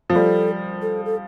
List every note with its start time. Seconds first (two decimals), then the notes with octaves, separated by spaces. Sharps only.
0.10 F3
0.15 G3 A4
0.82 A4
1.05 A4